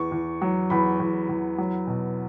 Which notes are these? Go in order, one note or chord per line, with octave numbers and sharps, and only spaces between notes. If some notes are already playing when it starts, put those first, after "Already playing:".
Already playing: E2 C#6
E2
F#3
E2 B5
E2
E2
F#3
B2